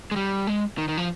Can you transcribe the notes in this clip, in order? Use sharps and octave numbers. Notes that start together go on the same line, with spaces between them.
G#3
G3
G#3
D#3
D#3
F3